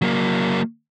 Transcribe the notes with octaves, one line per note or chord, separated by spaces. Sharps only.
F#3 A#3